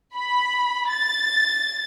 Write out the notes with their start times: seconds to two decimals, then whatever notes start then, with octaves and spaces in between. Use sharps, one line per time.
0.16 B5
0.93 A6